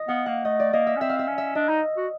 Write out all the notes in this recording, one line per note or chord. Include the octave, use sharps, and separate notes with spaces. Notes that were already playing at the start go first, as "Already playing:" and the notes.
Already playing: D#5
B3 F5
A#3 F#5
A3 D#5
D5
A#3 D#5
E5
C#4
C4 E5
F5
E5
C#4
E5
D4 D#5
D#4
F#4